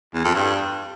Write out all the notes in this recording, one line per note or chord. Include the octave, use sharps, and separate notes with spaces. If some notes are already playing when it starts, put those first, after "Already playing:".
E2
F2
G2